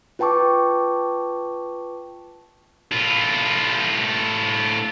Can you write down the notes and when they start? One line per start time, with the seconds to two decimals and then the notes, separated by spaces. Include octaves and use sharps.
0.19 F4 B4 G5 A5 C#6 D6
2.92 A2 F4